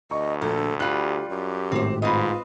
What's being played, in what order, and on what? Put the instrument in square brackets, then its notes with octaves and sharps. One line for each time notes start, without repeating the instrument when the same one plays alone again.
[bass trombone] D2 [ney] D#5 [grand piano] C#6
[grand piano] A#1 [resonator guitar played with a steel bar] A#2 [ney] A4
[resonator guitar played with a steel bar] G3 F4 [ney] G4 [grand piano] F#6
[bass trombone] F#2 [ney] G4
[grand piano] G#1 A2 [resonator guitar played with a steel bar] C4 C5
[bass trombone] G#2 [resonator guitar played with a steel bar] C4 B4 D#5 [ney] F4